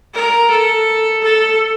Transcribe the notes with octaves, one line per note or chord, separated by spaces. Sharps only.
A#4
A4
A4